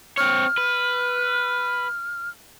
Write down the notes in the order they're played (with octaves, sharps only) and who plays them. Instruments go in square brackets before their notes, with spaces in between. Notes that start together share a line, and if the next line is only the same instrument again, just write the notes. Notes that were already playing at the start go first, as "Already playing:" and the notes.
[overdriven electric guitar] C4 C#5 [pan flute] F6
[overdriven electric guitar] B4